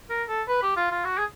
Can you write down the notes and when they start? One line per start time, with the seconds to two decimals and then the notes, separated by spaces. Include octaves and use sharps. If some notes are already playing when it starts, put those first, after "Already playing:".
0.10 A#4
0.28 A4
0.48 B4
0.62 G4
0.77 F4
0.91 F4
1.05 F#4
1.18 G#4